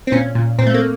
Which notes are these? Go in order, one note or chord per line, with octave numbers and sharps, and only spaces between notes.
C4
A#2 C#4
A#2
A#2 C4
A3
A#3